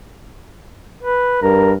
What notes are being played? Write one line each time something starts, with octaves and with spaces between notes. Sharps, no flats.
B4
G2 A#4